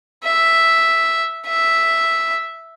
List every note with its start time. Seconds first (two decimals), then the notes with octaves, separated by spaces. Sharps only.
0.25 E5
1.47 E5